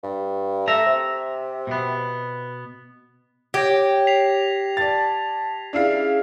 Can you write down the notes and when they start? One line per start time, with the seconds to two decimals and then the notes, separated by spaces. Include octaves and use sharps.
0.03 G2
0.68 A3 E5 A#5
0.86 C3
1.67 B2 B3
3.54 G4 C#5 G#6 A#6
4.07 B6 C7 F7
4.77 D5 A5 A6
5.73 C#4 D4 E4 G#4 F5